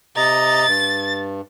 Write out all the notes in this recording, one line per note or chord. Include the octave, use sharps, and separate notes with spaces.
C3 D#5 A#5 A6
G2